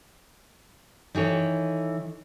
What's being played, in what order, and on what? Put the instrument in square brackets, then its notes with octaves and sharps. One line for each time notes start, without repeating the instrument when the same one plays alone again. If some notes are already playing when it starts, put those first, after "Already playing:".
[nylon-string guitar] D#3 E3 A4 C#5